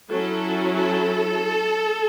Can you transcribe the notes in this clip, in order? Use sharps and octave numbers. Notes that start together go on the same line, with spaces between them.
F#3 C#4 E4 A4
A4